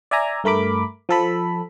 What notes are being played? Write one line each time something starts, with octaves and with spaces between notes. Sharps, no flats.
D5 E5 G#5 A#5
G2 A3 A#4 B5 D6
F3 A4 B5